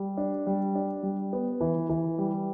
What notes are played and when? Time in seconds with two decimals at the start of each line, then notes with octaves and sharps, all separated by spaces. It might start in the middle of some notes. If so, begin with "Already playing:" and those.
Already playing: G3
0.17 D4
0.47 G3
0.75 D4
1.03 G3
1.33 B3
1.61 E3
1.90 E3
2.18 G3